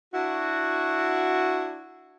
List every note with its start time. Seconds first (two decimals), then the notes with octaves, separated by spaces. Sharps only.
0.13 D4 E4 F#4